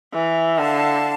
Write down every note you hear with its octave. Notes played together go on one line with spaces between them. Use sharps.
E3
D3 F5 A5